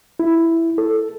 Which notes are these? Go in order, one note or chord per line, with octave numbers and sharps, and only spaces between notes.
E4
A4